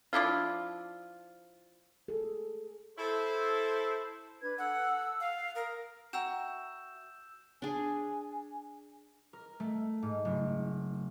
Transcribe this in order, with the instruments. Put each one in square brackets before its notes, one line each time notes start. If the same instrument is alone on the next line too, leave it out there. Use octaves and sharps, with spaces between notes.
[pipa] F3 D4 E4 F4
[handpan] G#4 A4
[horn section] E4 A4 C5
[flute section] D4 B4 G#6
[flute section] A4 E6 [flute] F#5
[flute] F5
[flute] A#4 [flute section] D#6
[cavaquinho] F#4 E5 [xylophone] G5 A#5 [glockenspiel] E6 G6 E7
[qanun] D4 G#4 [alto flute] G#5
[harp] A#4
A3
G#2
F#1